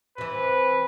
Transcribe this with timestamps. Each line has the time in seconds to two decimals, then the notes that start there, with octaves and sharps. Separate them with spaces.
0.18 C3 E3 B4